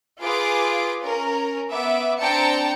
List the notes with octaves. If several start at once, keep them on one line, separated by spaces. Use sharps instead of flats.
F4 G#4 B4 D6 D7
C#4 A#4
B3 E5 D6
C4 D4 G5 A5 A#5 C#7